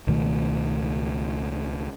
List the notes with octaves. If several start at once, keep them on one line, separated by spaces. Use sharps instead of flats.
C#2 B2 D#3 A3